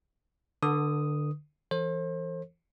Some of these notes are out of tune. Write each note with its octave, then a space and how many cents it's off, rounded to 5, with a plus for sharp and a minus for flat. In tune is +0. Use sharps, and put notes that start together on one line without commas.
D3 +15 B4 -20 D#6 +0
E3 +25 A4 +40 C5 +35